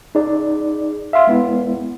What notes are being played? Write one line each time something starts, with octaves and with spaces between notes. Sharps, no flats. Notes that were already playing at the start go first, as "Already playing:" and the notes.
D#4 G#4 D5
E5 F5 C6
G#3 B3 E4